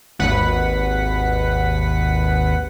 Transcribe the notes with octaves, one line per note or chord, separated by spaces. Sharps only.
G#1 D#2 B4 F#5 B6